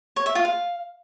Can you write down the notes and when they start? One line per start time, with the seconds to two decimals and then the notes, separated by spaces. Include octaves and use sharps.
0.16 C#5
0.26 E5
0.35 F4
0.45 F5